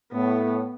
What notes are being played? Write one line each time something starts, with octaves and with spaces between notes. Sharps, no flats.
A2 B3